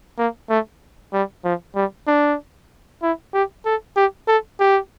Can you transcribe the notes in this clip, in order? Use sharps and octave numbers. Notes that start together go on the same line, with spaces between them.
A#3
A3
G3
F3
G3
D4
E4
G4
A4
G4
A4
G4